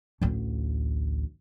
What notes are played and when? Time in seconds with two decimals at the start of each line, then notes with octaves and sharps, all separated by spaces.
0.21 A1 D2